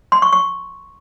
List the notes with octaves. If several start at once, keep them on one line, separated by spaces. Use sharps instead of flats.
C6
C#6
C#6